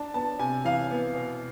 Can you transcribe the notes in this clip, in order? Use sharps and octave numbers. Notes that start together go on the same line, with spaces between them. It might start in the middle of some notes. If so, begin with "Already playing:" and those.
Already playing: D4 A5
B3 A5
C3 G#5
E3 F5
B3
B2